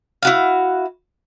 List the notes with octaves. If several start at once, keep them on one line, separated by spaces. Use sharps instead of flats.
E4 F#4 F5